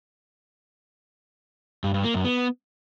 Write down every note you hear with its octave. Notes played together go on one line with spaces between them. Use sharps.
G2
G2
A#3
F#2
B3